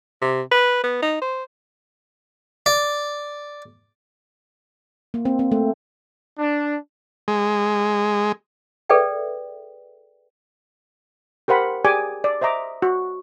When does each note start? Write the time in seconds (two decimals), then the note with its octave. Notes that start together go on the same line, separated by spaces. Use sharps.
0.22 C3
0.51 B4
0.84 B3
1.03 D#4
1.22 C5
2.66 D5
5.14 A#3
5.25 C4
5.39 C4
5.52 A3
6.38 D4
7.28 G#3
8.90 G#4 A4 B4 D5 E5 G5
11.48 G4 A#4 C5 F#5 B5
11.85 G4 G#4 D5 G#5 D6
12.24 D5
12.41 C5 D#5 E5 A#5 D6
12.82 F#4